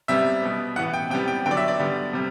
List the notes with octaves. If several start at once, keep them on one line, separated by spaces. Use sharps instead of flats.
C3 G3 B3 E5
B2 G3 B3
A2 E3 B3 F#5
G5
C3 G3 B3 G5
G5
D3 F#3 B3 G5
D5
E5
D5
D3 G3 B3
C3 G3